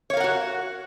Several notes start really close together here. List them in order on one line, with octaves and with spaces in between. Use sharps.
C#5 F5 A#4 F#5 F#4